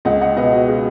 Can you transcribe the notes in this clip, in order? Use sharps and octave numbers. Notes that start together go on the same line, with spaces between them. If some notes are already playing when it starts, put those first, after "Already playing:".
C#2 D#5 F#5
D#5 F#5
B2 B4 D#5
F#4
G#4